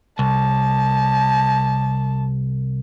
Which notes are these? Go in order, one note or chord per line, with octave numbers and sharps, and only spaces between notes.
C2 A5